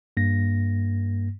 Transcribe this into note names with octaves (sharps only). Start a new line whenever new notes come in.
G2 A#3 A#6